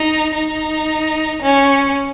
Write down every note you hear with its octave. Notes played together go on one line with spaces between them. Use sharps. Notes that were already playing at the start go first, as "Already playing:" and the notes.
Already playing: D#4
D#4
C#4